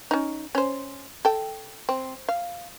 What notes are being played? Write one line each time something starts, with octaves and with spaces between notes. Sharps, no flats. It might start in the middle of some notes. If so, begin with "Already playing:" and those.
C#4 D#4
C#4 C5
A4 G5
C4
F5